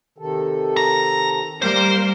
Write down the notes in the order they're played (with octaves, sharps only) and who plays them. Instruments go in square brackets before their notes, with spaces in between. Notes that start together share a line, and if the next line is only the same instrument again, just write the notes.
[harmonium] C3 D#3 A4
[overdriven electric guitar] A#5
[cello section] G3 A#3 A#4 [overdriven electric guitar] C5